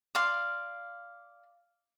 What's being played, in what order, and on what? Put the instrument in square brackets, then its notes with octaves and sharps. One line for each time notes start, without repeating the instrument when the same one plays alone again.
[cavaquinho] D5 F5 C6